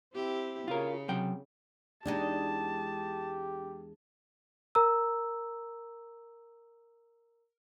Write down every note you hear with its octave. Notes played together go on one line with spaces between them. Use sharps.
C4 E4 G4
C#3 F4 A#4
C3 F#3 G5
E2 G#3 D4 D#4 G4 A5
A#4 A#5 E6